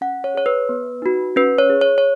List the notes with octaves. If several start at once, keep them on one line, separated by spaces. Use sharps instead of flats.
C#4 F#5
C#5
G#4 C#5
B4
B3
D#4 F#4
C#4 B4
C#5
G#4
C#5
C#5